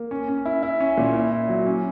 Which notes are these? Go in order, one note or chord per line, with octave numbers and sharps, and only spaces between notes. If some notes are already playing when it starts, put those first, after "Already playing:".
Already playing: A#3
C#4
C#4
E4
E4
C#4
A#2
E4
E4
F#3
C#4